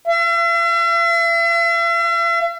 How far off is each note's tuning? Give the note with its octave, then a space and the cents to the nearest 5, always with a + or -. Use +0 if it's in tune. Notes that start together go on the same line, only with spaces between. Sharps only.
E5 +45